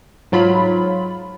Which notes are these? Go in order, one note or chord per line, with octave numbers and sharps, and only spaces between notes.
G#2 F#3 F4 B5